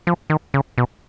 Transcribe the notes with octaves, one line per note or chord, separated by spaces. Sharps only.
F3
D#3
C#3
B2